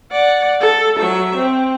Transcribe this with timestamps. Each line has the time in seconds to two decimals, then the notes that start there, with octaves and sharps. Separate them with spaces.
0.12 D5 F#5
0.60 A4
0.97 F#3 E5
1.36 C4